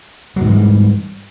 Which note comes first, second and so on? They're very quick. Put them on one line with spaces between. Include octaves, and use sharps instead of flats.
F#3 G#2 E3 G3